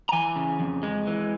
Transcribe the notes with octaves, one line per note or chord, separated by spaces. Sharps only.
A#5
E3 G#5
C#3
F2
G#3
E3